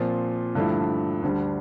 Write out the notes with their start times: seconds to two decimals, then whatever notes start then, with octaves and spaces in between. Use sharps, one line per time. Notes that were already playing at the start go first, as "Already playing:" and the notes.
Already playing: A#2 F3 C4 F4
0.55 G2 D3 F3 A3 E4
1.22 D2 D3 G3